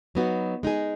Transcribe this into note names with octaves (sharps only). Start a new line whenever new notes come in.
F#3 B3 D#4 F#4
G#3 D#4 G#4